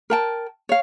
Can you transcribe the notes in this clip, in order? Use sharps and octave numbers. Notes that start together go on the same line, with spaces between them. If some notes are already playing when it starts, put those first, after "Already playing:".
A#4 G5 A5
C#5 F5